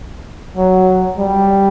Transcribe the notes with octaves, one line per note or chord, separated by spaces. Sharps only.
F#3
G3